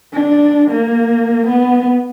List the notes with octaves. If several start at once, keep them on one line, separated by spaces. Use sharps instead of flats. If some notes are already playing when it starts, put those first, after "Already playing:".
D4
A#3
B3